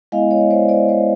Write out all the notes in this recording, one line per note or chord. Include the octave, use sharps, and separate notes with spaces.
G#3 B3 E4 D#5 F5
C#5 D#5
C5 D5
C5 D5
C5 D5